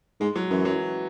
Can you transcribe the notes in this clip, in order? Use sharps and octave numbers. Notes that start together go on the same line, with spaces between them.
G#2 G#3
F#3
F#2 E3
F#3